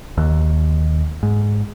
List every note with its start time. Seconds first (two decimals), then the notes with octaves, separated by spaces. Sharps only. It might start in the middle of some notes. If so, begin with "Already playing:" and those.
0.18 D#2
1.23 G#2